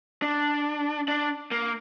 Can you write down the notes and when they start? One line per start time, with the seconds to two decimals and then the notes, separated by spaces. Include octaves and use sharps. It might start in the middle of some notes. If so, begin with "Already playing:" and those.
0.22 D4
1.08 D4
1.51 A#3